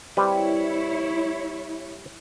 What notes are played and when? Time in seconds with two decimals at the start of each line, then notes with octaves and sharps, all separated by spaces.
0.17 G3 C4 E4 B4 C#5